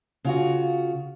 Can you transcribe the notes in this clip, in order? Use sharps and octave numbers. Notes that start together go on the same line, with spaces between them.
C#3 F4 F#4